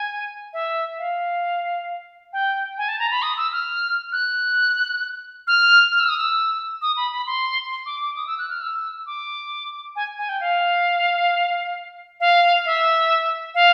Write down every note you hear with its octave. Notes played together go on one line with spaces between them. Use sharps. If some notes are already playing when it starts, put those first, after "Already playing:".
Already playing: G#5
E5
F5
G5
G#5
A5
A#5
B5
D#6
E6
F6
F#6
F6
F6
E6
D#6
E6
D#6
B5
B5
C6
D6
D6
D#6
E6
F#6
F6
E6
D6
G#5
G#5
G5
F5
F5
E5
F5